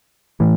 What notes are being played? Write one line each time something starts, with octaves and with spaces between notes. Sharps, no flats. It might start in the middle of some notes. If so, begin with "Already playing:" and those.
A2 E3